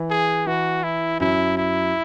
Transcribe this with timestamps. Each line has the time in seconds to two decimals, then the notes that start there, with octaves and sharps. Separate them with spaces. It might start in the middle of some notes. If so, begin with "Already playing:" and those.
Already playing: E3
0.10 G#4
0.47 E3 F#4
0.83 E4
1.20 F#2 F#3 E4
1.57 E4